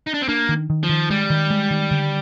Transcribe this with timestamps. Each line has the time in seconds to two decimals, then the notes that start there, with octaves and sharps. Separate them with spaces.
0.07 D#4
0.14 D4
0.22 C4
0.28 A#3 D4
0.49 D#3
0.70 D#3
0.83 F3
0.89 D#3
1.10 G3 G#3
1.30 D#3
1.50 G#3
1.71 D#3
1.91 D3